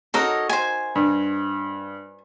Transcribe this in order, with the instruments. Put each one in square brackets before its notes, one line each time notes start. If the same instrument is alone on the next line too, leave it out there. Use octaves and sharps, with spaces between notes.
[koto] D#4 F#4 A#4 [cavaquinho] A4 C#5 D#5
[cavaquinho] C5 G#5
[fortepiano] G2